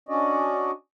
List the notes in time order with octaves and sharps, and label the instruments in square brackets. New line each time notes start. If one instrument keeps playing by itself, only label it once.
[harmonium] C#4 D4 F#4 D5 D#5